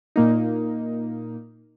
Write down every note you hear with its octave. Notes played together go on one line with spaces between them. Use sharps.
A#2 A#3 D#4